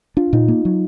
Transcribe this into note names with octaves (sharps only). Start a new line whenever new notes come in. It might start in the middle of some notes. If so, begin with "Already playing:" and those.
D4 F4
A#2 D#4
A#3
F#3